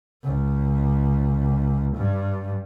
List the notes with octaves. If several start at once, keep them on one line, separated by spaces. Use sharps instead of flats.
C#2
G2